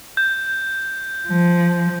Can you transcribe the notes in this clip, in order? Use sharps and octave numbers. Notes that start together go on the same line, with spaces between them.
G6
F3